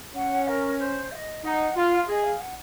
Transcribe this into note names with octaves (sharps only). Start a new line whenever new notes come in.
C#4 F#5
A#4
C5
F5
D#5
D#4 F#5
F4 F5
G#4 D#5
F5
F#5